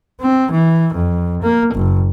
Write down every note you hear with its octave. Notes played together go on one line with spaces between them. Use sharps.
C4
E3
F2
A#3
F#1